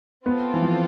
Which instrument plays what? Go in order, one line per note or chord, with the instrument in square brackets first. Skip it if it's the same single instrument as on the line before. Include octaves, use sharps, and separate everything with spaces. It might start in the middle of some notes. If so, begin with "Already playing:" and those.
[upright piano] B3 [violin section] C4 F4 A4
[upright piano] E3
F3